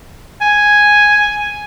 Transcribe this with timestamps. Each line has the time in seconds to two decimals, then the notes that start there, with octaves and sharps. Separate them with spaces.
0.41 G#5